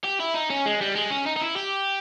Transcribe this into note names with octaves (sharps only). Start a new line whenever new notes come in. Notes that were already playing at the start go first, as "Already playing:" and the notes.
G4
E4
D#4
C#4
G#3
G3
G#3
C#4
D#4
D#4
E4
G4